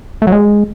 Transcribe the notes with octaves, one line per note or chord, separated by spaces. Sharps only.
A3
F#3
G#3